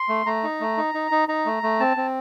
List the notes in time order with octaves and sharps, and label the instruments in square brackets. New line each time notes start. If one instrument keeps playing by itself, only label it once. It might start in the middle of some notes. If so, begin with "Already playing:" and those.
Already playing: [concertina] C6
A3
A3 A#5
D#4
A3
D#4
D#4
D#4
D#4 A#5
A3
A3
C4 A5
C4